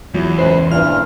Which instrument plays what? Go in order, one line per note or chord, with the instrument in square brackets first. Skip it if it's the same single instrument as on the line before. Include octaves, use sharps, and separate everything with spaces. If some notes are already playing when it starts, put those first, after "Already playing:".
[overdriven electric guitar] E2 [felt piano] F#3 E4
[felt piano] C#2 C#4 [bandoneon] F#2 B4 [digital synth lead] C5
[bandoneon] G2 A#2 [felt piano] E3 C4 E4 [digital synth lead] F6